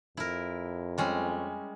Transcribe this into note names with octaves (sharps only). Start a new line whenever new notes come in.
F2 E4 A#4
G3 G#3 C#4